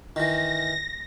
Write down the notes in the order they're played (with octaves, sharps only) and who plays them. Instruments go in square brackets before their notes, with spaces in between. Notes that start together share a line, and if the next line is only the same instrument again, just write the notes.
[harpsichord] D#3 E3 [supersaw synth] A#6